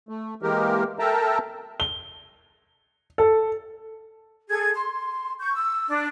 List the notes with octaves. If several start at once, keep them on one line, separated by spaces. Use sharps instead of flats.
A3
E3 G#3 A#3 G4 A#4
A4 A#4 E5 G5 A5 A#5
G7
A4
G#4 A4 G#6
C6
C#6 G6
E6
D4